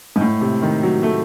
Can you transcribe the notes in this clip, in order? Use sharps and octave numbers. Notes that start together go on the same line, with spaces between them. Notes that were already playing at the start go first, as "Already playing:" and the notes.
G#2
A2
C3
D#3
F#3
A3